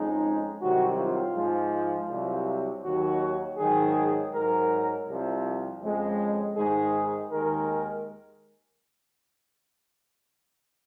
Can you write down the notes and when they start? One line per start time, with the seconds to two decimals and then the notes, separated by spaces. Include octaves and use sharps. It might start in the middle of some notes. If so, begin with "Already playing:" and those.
Already playing: F2 C#3 G#3 D#4
0.60 C2 C3 D#3 F#3 F#4
0.98 F4
1.34 G#2 F3 G#3
1.72 F4
2.09 C2 C3 F#3
2.83 D#2 D#3 F#3 F#4
3.58 G#2 D#3 F#3 G#4
4.33 G#2 F#3 A#4
5.07 C2 C3 F3
5.81 F2 C#3 G#3
6.56 G#2 D#3 G#3 G#4
7.30 D#2 D#3 G#3 A#4